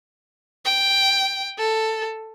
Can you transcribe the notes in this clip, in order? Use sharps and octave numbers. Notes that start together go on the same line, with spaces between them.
G5
A4